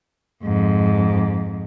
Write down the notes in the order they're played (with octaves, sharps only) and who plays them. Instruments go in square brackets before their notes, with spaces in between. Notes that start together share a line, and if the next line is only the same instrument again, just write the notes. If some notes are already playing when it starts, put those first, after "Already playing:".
[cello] F2 G#2